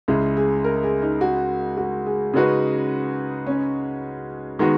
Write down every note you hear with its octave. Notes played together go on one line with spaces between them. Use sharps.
C#2 C#3 G#3 E4
G#4
A#4
G#4
D#4
F#4
F#4
G#4
C#3 G#3 C#4 D#4 F#4 B4
C#4
D#3 G#3 B3 D#4 F#4